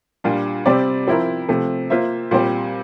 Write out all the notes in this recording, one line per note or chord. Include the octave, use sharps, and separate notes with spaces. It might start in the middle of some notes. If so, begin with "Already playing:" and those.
A#2 G3 D4 F4
C3 G3 C4 G4 D5
F3 C4 E4 A#4
C3 F3 A3
A#3 F4 C5 E5
A#2 G3 C4 G4 C5